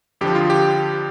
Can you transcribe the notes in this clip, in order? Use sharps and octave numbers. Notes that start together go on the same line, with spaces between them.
F2 D3 F3 G4
F4
G4